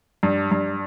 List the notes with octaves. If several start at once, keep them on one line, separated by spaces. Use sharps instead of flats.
G2
G2